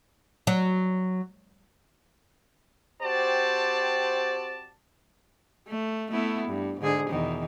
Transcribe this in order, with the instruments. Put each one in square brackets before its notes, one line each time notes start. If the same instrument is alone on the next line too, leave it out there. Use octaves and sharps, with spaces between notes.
[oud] F#3
[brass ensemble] C4 F#4 G4 C5 D5 A5
[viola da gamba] A3
A3 B3 E4
G2
G#2 D3 G#4
E2 B2 D#3